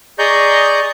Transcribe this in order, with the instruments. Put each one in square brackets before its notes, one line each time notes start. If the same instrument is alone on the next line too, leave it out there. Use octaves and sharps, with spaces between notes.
[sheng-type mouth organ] G#4 D5 D#5 A#5 C#6 G6